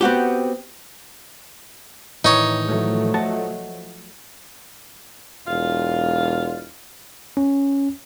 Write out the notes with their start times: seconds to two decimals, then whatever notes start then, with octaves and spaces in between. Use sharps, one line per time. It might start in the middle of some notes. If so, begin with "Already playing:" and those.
0.01 B3 C4 F#4 G4
2.25 A2 D#3 E3 D#4 C#5
2.66 F3 F#3 A3
3.14 D#5 F#5 A5
5.47 E1 F4 F5
7.37 C#4